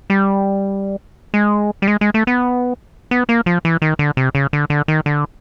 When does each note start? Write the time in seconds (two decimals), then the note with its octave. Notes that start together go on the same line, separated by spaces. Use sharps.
0.10 G3
1.34 G#3
1.82 G3
1.88 G#3
2.01 G#3
2.14 A3
2.27 B3
3.11 B3
3.29 A#3
3.46 F3
3.65 E3
3.82 D#3
3.99 D3
4.17 C3
4.35 C#3
4.53 D3
4.70 D3
4.88 D#3
5.06 D3